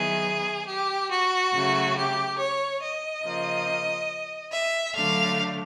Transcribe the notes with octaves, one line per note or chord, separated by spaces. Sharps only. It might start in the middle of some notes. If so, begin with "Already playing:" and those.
Already playing: D#3 F#3 B3 E4 G#4
G4
F#4
C#3 F#3 A3
G4
C#5
D#5
C#3 F3 A#3
E5
D3 F#3 A3 D4 F5